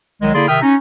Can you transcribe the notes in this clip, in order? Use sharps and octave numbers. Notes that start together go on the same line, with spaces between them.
C2 D#3 F#3 G#3
D3 A#3 E4 G#4 D5 C6
C3 D#3 E5 G5 D#6 F6
C#4 D#4